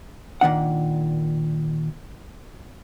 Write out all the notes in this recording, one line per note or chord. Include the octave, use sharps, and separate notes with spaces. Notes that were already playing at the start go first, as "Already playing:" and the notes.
A#2 D#3 D4 F#5